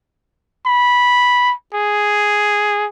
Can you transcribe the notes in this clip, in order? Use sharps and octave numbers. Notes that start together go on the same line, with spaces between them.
B5
G#4